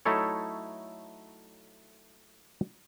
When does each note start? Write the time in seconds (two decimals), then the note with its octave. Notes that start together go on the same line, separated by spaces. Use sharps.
0.05 F#3 A3 D#4 E4 A4 C#5